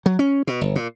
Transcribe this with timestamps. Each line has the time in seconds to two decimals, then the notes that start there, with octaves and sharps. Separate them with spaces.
0.06 F#3
0.19 C#4
0.47 B2
0.61 G1
0.76 A#2